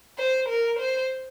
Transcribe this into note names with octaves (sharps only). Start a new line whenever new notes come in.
C5
A#4
C5